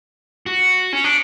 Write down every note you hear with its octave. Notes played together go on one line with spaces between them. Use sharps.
F#4
C#4
D4